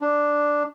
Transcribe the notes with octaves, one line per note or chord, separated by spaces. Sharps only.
D4